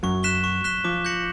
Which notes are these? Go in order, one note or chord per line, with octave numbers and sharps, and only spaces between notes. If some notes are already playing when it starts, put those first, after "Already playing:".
F#2 F#3 C#6
F#6 B6 E7 G7
C#6
F#6 B6 E7 G7
F3 D6
G6 A#6 C#7 F#7